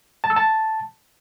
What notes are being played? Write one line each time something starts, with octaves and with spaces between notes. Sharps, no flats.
A5
E6
A5